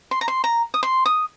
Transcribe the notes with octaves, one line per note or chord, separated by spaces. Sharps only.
C6
A#5
C6
A#5
D#6
C6
D#6